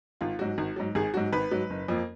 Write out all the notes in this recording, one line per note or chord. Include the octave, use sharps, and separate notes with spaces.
G#1 F4
G#2 F#3 F#4
G#1
G#2 F#3
G#1 G#4
G#2 F#3 F#4
G#1 B4
G#2 F#3
F#1
F2 F3 A#3